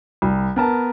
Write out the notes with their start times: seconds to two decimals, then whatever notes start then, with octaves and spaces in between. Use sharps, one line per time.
0.22 C2
0.56 B3 A#4 A5